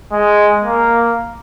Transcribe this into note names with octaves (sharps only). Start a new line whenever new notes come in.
G#3
A#3